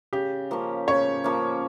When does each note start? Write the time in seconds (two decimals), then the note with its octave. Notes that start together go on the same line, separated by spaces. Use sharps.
0.13 C#3 G4
0.51 F3 A#3 C#4
0.88 C#3 C#5
1.24 F3 A#3 C#4